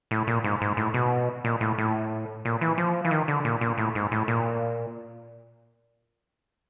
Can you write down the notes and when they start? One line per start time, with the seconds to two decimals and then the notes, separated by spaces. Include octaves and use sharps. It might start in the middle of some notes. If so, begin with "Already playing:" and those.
0.11 A2
0.27 A#2
0.44 G#2
0.61 G#2
0.77 A2
0.94 B2
1.45 A#2
1.61 A2
1.78 A2
2.45 A#2
2.61 E3
2.78 F3
3.05 E3
3.11 D#3
3.28 D3
3.45 A#2
3.61 A#2
3.78 A2
3.95 G#2
4.12 A2
4.28 A#2